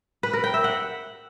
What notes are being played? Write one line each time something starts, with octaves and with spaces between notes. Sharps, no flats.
B4
A#4
G5
E5
F#5